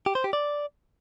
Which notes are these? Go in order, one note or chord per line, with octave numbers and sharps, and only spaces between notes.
G4
C5
G4
D5